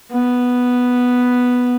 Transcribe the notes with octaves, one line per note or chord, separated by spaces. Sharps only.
B3